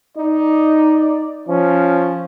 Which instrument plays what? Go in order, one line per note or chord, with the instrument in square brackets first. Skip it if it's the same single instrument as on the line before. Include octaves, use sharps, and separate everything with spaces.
[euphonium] D#4 [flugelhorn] D5
[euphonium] F3 [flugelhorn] C#4